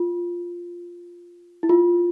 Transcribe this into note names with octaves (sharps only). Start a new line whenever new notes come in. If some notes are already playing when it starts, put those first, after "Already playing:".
Already playing: F4
E4
F4